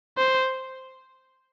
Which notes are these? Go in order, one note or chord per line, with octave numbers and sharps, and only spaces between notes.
C5